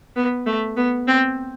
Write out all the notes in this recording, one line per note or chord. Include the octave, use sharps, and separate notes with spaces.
B3
A3
B3
C4